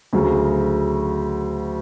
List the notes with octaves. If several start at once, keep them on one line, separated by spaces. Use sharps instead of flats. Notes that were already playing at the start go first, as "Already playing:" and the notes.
D2 C#3 F#3